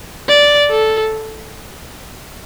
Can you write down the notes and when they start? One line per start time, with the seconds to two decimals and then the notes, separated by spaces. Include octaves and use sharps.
0.28 D5
0.70 A4